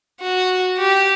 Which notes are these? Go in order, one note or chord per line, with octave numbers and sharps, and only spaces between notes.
F#4
G4